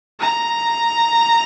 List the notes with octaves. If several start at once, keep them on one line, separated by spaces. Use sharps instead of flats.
A#5